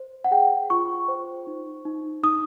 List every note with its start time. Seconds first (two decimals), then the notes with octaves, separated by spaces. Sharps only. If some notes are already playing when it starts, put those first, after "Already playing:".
Already playing: C5
0.24 F#5
0.31 G#4 G5
0.70 F4 C#6
1.08 C5
1.47 D#4
1.85 D#4
2.23 D#4 D#6